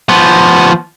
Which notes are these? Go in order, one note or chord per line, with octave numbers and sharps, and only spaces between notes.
F3 B3